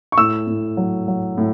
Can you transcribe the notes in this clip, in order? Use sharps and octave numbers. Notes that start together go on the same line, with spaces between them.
C#6
A2 E6
A2
F#3
F#3
A2